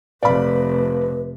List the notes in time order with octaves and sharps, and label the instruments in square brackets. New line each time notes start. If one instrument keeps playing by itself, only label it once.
[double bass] F1 [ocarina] B4 [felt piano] D5 F5 B5